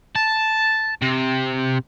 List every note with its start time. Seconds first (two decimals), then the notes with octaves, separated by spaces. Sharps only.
0.16 A5
1.02 C3